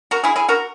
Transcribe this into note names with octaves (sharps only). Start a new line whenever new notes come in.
F#4 A#4
E4 G#4
E4 G#4
F#4 A#4